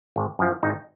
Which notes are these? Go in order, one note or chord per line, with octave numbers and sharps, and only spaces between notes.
G#1
F#2 F3
G#1 D#4